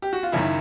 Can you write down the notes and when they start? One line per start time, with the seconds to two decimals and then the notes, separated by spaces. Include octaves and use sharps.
0.02 G4
0.13 F#4
0.23 F4
0.32 F#1 F#2 D#3 E4